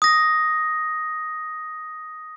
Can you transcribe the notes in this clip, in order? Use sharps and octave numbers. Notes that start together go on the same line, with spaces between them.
D#6 A#6